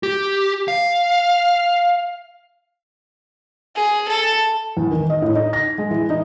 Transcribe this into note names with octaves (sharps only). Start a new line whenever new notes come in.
G4
F5
G#4
A4
E2
D#3
D#5
A2
D#4
A#6
G#3
E3
D#4